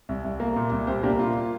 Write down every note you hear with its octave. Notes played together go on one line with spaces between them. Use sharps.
C2
C2
A#3
A#2
C2
C2 G4 C5
A#3 D4 G4
A#2 F4